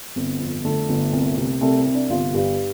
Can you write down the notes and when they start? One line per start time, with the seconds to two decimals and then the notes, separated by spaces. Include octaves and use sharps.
0.16 G1 C4
0.40 F2
0.65 D3 A3
0.89 G1
1.13 C2
1.38 C3
1.61 C2 A3
1.78 C4
1.86 C3
1.94 D4
2.10 G1 F4
2.34 G2 G4